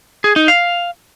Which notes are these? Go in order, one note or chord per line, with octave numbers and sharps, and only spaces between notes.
G#4
D#4
F5